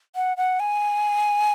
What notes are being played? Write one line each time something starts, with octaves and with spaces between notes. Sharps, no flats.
F#5
F#5
G#5